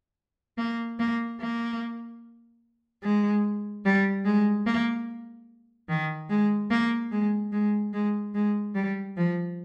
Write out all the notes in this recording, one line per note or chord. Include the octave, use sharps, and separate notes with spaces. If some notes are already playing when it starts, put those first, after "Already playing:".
A#3
A#3
A#3
G#3
G3
G#3
A#3
D#3
G#3
A#3
G#3
G#3
G#3
G#3
G3
F3